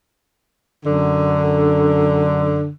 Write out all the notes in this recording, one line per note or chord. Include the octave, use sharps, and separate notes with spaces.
F#2 D3